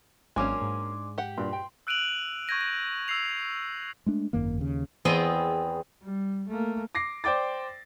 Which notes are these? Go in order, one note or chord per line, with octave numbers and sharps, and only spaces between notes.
G#1 F#3 A#3 C#4 D4 G#5 C6 D6
G#2
G4 F#5
G2 A#2 C6
G5
E6 F#6 D7 D#7 F7 F#7
C#6 G6 G#6 A#6 D#7
A#6
E6 A#6 C7 F7
G#3 A3 D4
G#1 F#2 D#3 A#3
D#2 C#3
E2 B3 C4 G#4 D#5 G5
G3
A3 A#3
D6 A#6 C7
C5 D5 G5 D6 A6